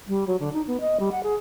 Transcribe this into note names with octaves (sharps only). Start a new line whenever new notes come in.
G3
F#3
D3
D#4
B3
D#5
G3
F#5
G#4